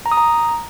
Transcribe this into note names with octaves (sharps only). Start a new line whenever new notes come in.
A#5
D#6
A#5